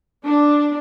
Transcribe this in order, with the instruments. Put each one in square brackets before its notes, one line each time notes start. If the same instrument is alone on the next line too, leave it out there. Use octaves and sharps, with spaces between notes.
[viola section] D4